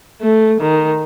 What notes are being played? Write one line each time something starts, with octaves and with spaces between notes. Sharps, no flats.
A3
D#3